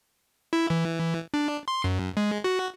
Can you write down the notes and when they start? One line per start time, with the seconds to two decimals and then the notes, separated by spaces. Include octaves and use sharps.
0.53 E4
0.70 E3
1.34 D4
1.68 C6
1.84 F#2
2.17 G#3
2.44 F#4